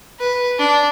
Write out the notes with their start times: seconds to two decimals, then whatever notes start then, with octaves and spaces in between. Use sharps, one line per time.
0.19 B4
0.59 D4